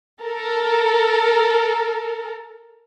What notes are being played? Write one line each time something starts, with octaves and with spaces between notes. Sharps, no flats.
A4 A#4